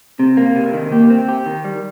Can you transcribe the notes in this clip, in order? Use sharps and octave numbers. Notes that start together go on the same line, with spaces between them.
C3 C4
A#3
C3
D#3
A#3 G4
C4
G4
D#3
G3